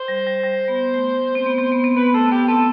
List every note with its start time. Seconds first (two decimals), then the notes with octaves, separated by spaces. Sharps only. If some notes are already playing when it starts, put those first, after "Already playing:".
Already playing: C5
0.08 G3
0.26 G3
0.43 G3
0.68 B3
0.94 A3
1.35 C4
1.46 B3
1.58 C4
1.72 B3
1.84 C4
1.97 B3 B4
2.14 A3 A4
2.31 B3 G4
2.48 C4 A4